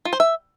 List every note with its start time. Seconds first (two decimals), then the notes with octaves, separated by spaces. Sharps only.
0.05 F4
0.13 C5
0.20 E5